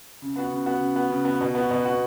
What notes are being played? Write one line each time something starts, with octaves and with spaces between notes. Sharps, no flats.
C#3
B3 F#4
C#3
B3 F#4
C#3
B3 F#4
C#3
B3 F#4
B2
B3 F#4
B2
B3 F#4